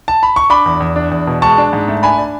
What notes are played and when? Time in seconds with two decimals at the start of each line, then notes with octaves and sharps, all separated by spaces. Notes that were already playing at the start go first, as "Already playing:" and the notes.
0.08 A5
0.23 B5
0.36 C#6
0.50 D4 B5 D6
0.66 E2
0.80 E2
0.96 D4
1.11 E2
1.27 B2
1.42 G#3 A5 C#6
1.58 D4
1.73 G#2
1.88 A3
2.03 D4 G#5 B5
2.18 D4